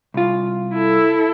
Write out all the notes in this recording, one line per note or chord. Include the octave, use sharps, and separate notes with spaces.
C2 F4
E4 A4